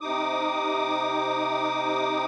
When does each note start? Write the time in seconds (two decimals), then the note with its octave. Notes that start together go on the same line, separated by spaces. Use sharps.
0.01 C3 D#4 D6 D#6